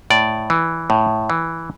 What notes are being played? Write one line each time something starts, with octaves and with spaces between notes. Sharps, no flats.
A2 D5
E3
A2
E3